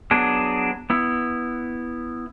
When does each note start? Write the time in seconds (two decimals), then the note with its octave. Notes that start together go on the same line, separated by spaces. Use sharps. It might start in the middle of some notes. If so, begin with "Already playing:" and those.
0.11 F#3 B3 D4 G#4
0.90 B3 E4